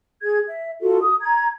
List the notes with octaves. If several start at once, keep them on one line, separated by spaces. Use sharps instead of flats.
G#4 G#6
E5
D#4 F4 F#4 A4
D#6
A#5 G#6